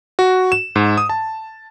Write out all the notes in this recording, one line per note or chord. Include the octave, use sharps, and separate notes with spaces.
F#4
E7
G#2
D#6
A5